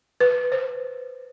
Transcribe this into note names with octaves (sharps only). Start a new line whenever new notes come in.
B4
C5